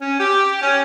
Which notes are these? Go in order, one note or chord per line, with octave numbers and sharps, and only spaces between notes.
C#4
G4
C#4